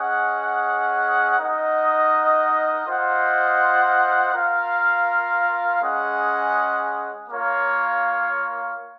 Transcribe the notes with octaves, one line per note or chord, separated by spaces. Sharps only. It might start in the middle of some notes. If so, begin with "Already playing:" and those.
Already playing: C#4 G#4 D#5 F#5
D#4 A#4 D#5 F#5
F4 C5 D#5 F#5
F4 A#4 F5
G#3 C#4 G#4 D#5 F#5
A#3 F4 A#4 C#5 F5